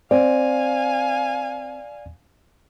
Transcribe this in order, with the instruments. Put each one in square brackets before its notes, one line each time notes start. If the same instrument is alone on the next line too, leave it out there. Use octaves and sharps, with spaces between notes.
[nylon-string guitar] C4 [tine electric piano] D5 [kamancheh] F5 G#5